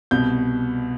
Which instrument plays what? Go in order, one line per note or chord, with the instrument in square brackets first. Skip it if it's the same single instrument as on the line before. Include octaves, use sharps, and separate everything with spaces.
[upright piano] C2 B2 G6